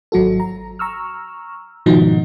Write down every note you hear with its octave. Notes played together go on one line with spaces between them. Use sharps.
G#1 F#3 F#4 A4
A#5
A#5 C#6 E6 F6
G#2 B2 D#3 F3 D#4 F#4